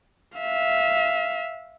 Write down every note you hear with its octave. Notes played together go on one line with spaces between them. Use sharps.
E5 F5